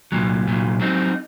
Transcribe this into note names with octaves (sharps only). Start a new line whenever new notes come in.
C2 A#2 F#3
C2 A#2 F#3
F#3 C4 D#4